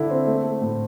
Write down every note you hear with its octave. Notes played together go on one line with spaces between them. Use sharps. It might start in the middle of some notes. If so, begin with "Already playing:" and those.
Already playing: D3 E4
C4
A3
A3
A2